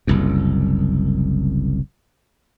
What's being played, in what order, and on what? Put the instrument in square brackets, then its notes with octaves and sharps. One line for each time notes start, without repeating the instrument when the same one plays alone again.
[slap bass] F#1 C2 F#2